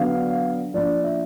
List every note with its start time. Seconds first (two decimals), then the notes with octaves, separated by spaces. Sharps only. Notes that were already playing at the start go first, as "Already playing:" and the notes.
Already playing: D3 F#3 B3 F5
0.74 F3 A#3 D4 D5
1.04 E5